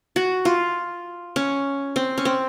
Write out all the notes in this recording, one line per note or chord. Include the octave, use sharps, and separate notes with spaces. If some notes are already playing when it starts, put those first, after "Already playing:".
F#4
F4
C#4
C4
C#4
C4